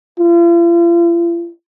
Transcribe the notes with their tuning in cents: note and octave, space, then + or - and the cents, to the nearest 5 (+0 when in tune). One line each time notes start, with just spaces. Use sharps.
F4 -45